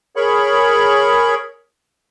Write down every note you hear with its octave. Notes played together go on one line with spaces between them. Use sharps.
G#4 A#4 C#5 B5 C#6